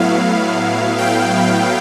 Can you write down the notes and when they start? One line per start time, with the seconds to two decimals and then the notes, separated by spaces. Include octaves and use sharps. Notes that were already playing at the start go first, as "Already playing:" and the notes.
Already playing: A2 F#3 B3 E4 F5
0.98 G5